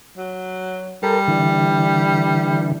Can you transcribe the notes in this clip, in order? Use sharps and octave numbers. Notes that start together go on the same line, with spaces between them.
F#3
G3 A4 A#4
D3 E3